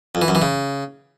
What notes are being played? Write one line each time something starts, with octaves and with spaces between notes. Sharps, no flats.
F2
E3
F#2
E3
C#3